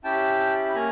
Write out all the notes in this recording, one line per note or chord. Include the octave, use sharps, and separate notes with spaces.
C#4 E4 G4 G5 A5
B5
A#3 C#4 G#5 A#5